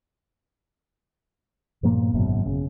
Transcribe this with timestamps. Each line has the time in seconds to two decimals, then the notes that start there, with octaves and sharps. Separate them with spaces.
1.83 G2 A#2 F3 A#3
2.14 G#1 F#2 B2
2.46 C#3